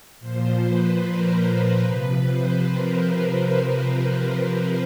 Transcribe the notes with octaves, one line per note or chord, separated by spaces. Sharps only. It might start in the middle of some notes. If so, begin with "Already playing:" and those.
A#2 F3 C5
B4
A#4
A#4
C3 F3 B4
C5
A#4